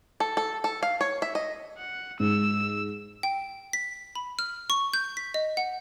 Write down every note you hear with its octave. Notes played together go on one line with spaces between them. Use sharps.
A4
A4
A4
F5
C#5
E5
D#5
F#5
G#2 E6
G5
B6
B5
F6
C#6
G6
B6
D#5
F#5